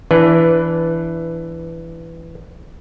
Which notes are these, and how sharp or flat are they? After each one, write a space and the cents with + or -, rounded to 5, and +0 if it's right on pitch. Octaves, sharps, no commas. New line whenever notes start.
E3 +5 D4 -10 B4 +0